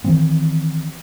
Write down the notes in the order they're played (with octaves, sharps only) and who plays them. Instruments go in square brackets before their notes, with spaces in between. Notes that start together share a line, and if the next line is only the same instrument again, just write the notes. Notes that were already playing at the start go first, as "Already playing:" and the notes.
[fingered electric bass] D#3 E3 B3 C4